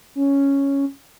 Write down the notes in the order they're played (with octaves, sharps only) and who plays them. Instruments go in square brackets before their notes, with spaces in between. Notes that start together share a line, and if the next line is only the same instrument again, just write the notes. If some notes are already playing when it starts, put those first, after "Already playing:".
[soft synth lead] C#4